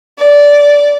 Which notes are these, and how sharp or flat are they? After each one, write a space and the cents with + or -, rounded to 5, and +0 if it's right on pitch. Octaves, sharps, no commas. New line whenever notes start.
D5 -15